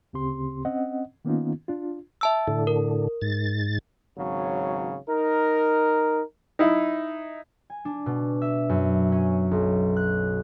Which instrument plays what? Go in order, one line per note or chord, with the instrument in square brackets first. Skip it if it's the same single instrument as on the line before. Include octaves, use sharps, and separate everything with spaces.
[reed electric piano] D2 C#3 C4 G4 C6
C4 C#4 D#5 F#5
D#3 A#3 B3 C#4 D#4 F4
D4 F4
[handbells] E5 A5 E6
[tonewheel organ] A2 D3
[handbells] A#4
[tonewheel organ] G#2 A6
[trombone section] G#1 C#3 F#3
D#4 A#4
[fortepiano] D#4 E4
[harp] G#5
D4
B2
E5
F#2
C#4
B1
F#6